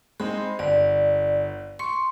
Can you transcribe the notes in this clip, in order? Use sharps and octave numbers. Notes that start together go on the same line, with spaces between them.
G#3 C4 D#4 B5
G1 D5
C6 C#6 C#7